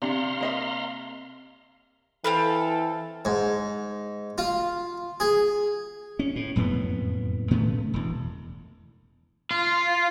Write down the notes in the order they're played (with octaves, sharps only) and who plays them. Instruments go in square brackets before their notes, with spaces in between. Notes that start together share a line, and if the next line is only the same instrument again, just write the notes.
[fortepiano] C3 [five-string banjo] D4 [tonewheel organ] F5 A#5 C6
[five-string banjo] A#3 D#5 E5
[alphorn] E3 [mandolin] C4 F5 B5 [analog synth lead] A4
[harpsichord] G#2
F4
G#4
[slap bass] C#4
A2
F#1 F2 A2 B3
A2 C#3 A3 B3
E1 E2
[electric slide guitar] F4